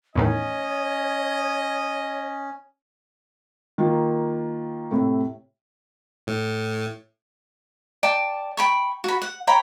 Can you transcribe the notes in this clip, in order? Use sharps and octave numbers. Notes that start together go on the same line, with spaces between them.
E2 A2 D#3 C#4 C#5 D#5
D#3 A#3 F4
A2 C3 A3
A2
D5 G5 A5 D6
G5 B5 C#6
F#4 B5
F#5
C#5 G5 A#5 B5